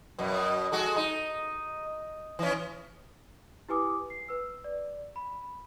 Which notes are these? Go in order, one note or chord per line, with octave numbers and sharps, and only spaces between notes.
F#2 B2
G#3 F#4 A4
D#4
E3 C#4
E4 G4 B4 G#5 D6 D#6
C7
B4 E6
D5
B5